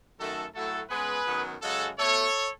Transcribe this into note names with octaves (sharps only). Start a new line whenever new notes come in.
F#2 D#3 A3 F#4 A4
A2 F#3 A3 F#4 A4
C#3 G#3 B3 G#4 B4
F#2 D#3 F#3 B3
F#2 C#3 G#3 F#4 A4
B2 A3 A4 C#5